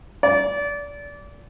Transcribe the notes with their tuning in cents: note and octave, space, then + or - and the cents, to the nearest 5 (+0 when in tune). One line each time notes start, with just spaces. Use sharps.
D5 -25